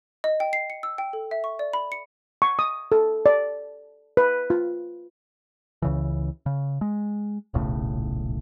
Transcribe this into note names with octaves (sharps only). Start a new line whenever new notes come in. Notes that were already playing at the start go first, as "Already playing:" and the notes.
D#5
G5
C7
C#7
E6
G5
A4
E5
C#6
D5
B5
C#7
C#6
D#6
A4
D5
B4
F4
C#2 C#3 E3
C#3
G#3
D#1 B1 A2 C#3